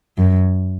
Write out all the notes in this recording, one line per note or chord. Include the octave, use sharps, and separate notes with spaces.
F#2